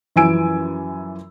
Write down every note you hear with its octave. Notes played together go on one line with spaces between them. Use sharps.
F#2 E3 F3 G#5 E6 D7